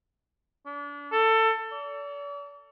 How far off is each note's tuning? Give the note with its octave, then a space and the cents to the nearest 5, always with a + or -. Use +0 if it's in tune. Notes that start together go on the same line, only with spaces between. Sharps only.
D4 -30
A4 +20
D5 -45